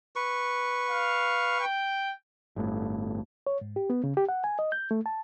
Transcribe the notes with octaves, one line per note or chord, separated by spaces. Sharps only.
B4 C#6
F5
G5
G1 A2
C#5
G#2
G4
B3
C#3
G4
F#5
G#5
D#5
G6
A3
A5